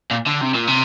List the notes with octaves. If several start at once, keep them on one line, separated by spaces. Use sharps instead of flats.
A#2
D3
C3
A#2
C3